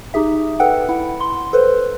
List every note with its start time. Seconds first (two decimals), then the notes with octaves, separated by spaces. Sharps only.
0.14 D#4 G4 G#4 E5
0.60 A4 B4 F#5 G5
0.89 E4 F#5
1.20 C6
1.53 A4 B4 C5